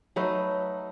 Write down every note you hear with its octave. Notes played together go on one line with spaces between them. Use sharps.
F#3 A3 D#4 B4